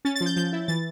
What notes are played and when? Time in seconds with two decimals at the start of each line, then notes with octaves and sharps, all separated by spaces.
0.05 C#4 A6
0.15 A6
0.21 F3
0.26 G6
0.36 F3 G6
0.53 E4
0.68 E3 A6